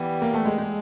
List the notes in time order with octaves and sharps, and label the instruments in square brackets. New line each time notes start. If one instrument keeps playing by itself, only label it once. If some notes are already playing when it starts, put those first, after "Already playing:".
Already playing: [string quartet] E3 G3 B3
[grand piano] A#3
A3
G#3
G#3